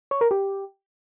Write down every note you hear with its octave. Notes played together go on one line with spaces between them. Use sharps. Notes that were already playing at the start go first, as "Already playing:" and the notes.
C#5
A#4
G4